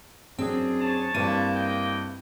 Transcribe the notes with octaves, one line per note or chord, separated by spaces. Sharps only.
F#2 C4 D4 G#4
C#5 A5
G2 A#3 C4 E4 D#7
D#5 G5